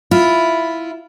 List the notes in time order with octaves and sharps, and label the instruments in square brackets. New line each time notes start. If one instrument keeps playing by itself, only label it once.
[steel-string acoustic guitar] E4 F4